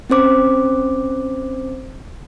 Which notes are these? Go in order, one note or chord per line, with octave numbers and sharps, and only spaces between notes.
C4 C#4 C5 D6